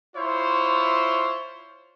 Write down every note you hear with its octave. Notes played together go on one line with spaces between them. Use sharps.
E4 F4 C5 C#5